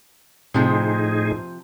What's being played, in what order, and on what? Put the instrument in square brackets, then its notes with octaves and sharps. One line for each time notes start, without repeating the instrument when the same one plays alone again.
[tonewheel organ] A2 D#4 G#4 [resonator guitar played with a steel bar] C3 F3